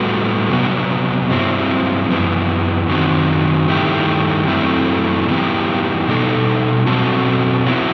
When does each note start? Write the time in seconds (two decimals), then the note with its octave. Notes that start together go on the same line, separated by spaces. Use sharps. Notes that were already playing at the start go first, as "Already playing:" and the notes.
Already playing: A2 G3 B3 F#4 A4
0.50 C3 F#3 B3
1.29 G2 F#3 C4 E4
2.09 F#2 E3 B3
2.89 F#2 D#3 F#3 C4
3.68 G2 D#3 A3 E4 G4
4.48 F#2 F#3 A3 C4 E4
5.28 G2 E3 B3 E4 G4
6.07 B2 G3 D#4 A4
6.87 B2 F#3 C4 F#4 A4
7.66 F#3 B3 E4